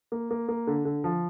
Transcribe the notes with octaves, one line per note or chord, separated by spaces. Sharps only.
A#3
A#3
A#3
D3
D3
F3